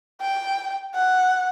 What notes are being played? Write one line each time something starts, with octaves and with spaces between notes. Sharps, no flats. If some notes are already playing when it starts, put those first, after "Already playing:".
G5
F#5